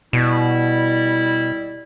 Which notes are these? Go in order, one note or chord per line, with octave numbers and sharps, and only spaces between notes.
B2 G3 E4